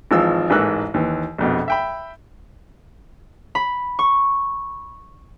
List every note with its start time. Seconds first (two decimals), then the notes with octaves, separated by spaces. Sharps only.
0.11 G#1 E3 F3 G#3 F4 E6
0.50 A1 G#2 E3 A#4 E6 F#6
0.94 D#2 E3
1.38 A#1 F2 B2
1.68 E5 G5 B5
3.55 B5
3.99 C#6